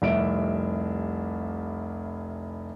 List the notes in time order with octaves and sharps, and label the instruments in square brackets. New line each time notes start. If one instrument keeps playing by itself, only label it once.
[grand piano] F1 C2 E5 D7